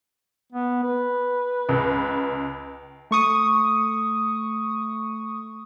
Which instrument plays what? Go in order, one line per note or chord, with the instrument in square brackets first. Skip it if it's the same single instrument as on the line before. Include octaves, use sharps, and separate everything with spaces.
[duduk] B3
B4
[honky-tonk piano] C#2
[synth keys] A3 C#6 D#6